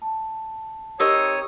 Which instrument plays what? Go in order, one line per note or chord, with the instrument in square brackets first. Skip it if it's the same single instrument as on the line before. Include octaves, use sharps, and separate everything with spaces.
[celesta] A5
[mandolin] C4 D#4 [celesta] G4 A#4 D#5 [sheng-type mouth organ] C#5 D#6